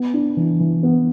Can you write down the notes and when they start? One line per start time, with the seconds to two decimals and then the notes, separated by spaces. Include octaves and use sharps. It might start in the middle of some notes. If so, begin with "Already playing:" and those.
Already playing: B3
0.14 D4
0.37 E3
0.60 E3
0.83 B3